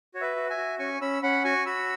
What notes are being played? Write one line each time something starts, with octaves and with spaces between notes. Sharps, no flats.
F#4 C#5
B4 E5
F#4
E5 G#5
F#4
C#4 G#5 C#6
C#4 B5 E6
C#4 F#5 B5
F#4 G#5 C#6
F#4 B5 E6